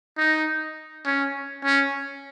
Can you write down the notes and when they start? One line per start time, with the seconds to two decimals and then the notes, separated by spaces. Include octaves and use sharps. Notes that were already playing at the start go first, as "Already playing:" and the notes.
0.17 D#4
1.06 C#4
1.65 C#4